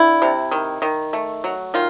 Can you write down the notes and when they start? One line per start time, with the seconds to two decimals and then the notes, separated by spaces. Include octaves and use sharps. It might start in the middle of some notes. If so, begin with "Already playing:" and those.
Already playing: D3 E4
0.22 C3
0.51 D#3
0.82 D#3
1.13 A3
1.44 F#3
1.74 D#3 F4